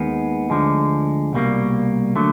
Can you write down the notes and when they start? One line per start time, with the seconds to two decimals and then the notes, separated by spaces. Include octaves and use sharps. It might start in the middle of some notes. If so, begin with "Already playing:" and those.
Already playing: D#2 D#3 G#3 B3
0.50 D2 D3 F3 G#3
1.33 C2 B2 G3 A#3
2.16 D3 F#3 A3